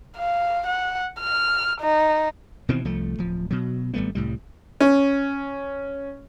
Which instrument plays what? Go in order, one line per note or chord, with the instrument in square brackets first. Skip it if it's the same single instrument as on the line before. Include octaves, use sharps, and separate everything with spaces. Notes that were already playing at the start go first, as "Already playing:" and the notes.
[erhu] F5
F#5
F6
D#4
[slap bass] B2 D#3 E3 C4
C2 F3 A3
D1 F3
B2 F#3
G#1 G3 A3 B3
C2 A2 G3
[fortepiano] C#4